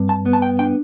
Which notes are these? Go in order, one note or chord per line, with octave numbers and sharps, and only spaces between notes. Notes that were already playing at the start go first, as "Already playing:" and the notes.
Already playing: G2 C4
A5
B3
A5
G5
D4 G5